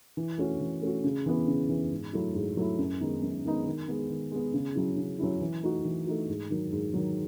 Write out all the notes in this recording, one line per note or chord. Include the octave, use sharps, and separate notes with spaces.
E3
A3 C#4 F#4
E3
A3 C#4 F#4
C#3
E3 B3
C#3
E3 B3
G#2
F#3 A3 E4
G#2
F#3 A3 E4
F#2
D#3 G#3 B3 D#4
F#2
D#3 G#3 B3 D#4
D#3
G#3 B3
D#3
G#3 B3
C#3
F#3 C#4 E4
C#3
F#3 C#4 E4
E3
A3 D#4 F#4
E3
A3 D#4 F#4
G#2
D#3 F#3
G#2
D#3 F#3